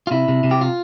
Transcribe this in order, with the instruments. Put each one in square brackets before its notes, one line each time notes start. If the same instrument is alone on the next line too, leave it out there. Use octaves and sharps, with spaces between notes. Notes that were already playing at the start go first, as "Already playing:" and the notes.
[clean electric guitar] F4
C3 E4
C3
C3
G4
F4